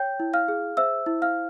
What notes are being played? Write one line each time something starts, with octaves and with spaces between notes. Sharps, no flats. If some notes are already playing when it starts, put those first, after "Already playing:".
Already playing: C#5 G5 G6
E4
F5 F6
G#4
C5 E5 E6
E4
F5 F6